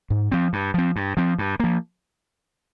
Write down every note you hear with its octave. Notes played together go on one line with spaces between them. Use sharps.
G#2
F3 C4
G2
F3 C4
G2
F3 C4
G2
F3 A#3